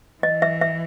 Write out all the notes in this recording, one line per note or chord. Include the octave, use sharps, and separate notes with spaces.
E3 D#5
E5
E5